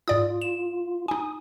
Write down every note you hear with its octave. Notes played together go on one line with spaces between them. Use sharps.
G#2 F4 D5 D#6
E7
D#4 G#5 D#6